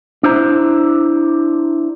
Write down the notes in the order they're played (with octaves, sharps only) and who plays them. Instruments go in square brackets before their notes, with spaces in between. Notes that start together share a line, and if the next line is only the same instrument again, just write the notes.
[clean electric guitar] D4 E4 C5 A#5